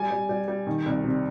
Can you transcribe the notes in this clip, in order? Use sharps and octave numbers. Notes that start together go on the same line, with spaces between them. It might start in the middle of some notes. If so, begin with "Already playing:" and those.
Already playing: G3 G#5
G3
G3
G3
D#3
C2
C3